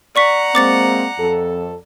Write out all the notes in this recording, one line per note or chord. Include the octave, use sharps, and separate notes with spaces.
D5 F#5 A#5 C#6 B6
G#3 A#3 C4 D6 A6 C#7
F2 A4